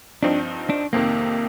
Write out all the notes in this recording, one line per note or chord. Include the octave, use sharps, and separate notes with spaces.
G2 F3 C4 D4 D#4
D4
F2 C3 D#3 A#3